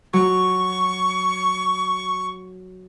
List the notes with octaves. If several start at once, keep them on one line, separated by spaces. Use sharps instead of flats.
F#3 C#6